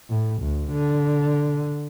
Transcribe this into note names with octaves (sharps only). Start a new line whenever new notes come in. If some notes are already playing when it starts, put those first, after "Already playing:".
A2
D2
D3